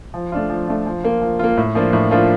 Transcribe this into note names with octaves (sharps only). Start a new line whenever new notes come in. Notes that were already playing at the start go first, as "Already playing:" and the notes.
F3
A3 D4 F4
F3
A3 D4 F4
F3
A#3 F4
F3
A#3 F4
A2
F3 A#3 D4 F4
A2
F3 A#3 D4 F4